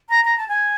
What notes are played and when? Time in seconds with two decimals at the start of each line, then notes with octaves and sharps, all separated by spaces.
0.09 A#5
0.25 A#5
0.38 A5
0.48 G#5